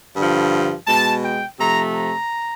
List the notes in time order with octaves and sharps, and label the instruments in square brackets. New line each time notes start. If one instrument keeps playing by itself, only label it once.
[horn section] G2 D3 F3
B2 G#3 A5
G5
C3 F3 A3 A#5
A#5